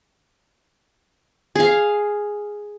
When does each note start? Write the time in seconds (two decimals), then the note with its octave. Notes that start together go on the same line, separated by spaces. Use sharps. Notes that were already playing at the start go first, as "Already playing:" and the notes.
1.56 G#4 F5